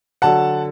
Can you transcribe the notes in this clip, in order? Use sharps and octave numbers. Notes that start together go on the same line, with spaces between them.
D3 F#3 F#5 A5